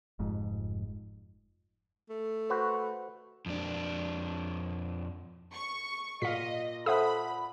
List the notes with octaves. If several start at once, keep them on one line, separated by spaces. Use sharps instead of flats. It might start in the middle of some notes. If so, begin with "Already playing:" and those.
F1 F2 G#2
A3
F#4 B4 C5
F2 D4
C#6
A#2 D#5 F5 B6
A4 C5 E5 F#5 B5 D#6